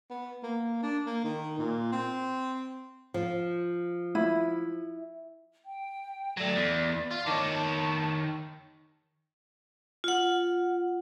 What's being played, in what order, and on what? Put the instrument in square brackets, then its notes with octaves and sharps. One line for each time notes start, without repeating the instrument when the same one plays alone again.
[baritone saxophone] B3
A#3
D4
A#3
D#3
A#2
C4
[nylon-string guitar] F3
[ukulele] E4
[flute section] G5
[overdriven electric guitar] F#3 A3 [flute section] D5
[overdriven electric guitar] E2
F4
[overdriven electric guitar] D#3 C#5 [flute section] D#5 A5 D6
[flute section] A5
[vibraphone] F4 F#5